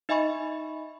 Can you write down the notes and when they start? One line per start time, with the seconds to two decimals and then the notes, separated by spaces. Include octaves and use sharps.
0.09 D#4 D#5 E5 G#5 B5 C#6